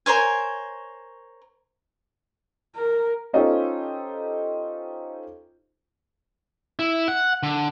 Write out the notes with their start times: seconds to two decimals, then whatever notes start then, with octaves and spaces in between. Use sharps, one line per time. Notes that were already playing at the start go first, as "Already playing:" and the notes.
0.06 A#4 C5 C#5 G#5
2.76 A#4
3.33 C#4 D#4 F4 G4 A4 C5
6.79 E4
7.08 F#5
7.43 D3